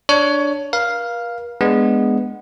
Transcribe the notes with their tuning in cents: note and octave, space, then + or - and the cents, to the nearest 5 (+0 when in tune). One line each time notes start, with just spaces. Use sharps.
D4 +0 C#5 +15
A#4 +45 F5 +0
G#3 +0 B3 +0 D4 +0